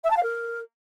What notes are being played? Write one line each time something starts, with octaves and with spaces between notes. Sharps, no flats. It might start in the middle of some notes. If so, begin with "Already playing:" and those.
E5
A5
F5
A#4